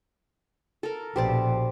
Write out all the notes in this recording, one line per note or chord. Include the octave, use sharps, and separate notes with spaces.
A4 A#4
A#1 B2 G4 C5 D5